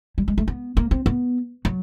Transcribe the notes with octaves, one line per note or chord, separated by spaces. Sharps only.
G3
G#3
A3
B3
A#3
C4
B3
F#3